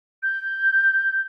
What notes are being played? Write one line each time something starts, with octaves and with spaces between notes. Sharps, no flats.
G6